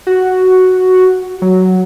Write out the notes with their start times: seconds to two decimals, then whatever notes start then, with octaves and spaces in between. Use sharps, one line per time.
0.07 F#4
1.42 F#3